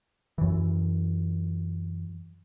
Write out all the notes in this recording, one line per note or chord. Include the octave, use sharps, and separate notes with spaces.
F#2 E3